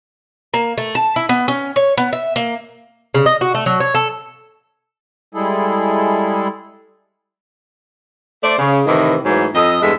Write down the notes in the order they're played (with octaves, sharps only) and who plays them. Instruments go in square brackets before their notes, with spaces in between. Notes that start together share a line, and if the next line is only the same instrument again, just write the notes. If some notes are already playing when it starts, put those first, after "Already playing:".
[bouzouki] A#3
A3
A5
E4
B3
C#4
C#5
B3
E5
A#3
C#3
D#5
F#4
A3
F#3
C#5
A4
[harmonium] G3 G#3 E4 G#4 A4
[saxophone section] A3 C5 D5
C#3
A2 C3 D#3 E3
G#2 E3 F#3 A3
F2 A4 D#5
E2 G2 G#3 A4 E5